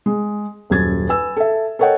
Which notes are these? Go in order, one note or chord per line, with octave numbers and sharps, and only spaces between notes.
G#3
D#1 F#2 G#6 A6
B4 G#5 E6
A4 E5
A4 A#4 C#5 D#5 F#5 G5